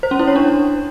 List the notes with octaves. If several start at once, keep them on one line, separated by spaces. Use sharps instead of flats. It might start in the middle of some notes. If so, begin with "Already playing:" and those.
C5
C#4
E4
C#5
D4